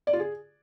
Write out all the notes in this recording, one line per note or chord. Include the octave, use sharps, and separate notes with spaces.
D5
F4
G#4